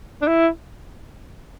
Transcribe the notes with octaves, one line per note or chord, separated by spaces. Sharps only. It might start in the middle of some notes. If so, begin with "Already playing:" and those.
D4
E4